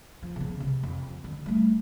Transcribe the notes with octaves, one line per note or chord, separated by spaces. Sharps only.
F3
C#3 B3
C3
F2
D3
G3 A3